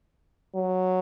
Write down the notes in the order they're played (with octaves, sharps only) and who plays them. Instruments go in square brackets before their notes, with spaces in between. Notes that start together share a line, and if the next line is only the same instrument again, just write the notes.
[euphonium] F#3